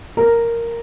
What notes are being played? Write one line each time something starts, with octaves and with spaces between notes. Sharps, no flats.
A#4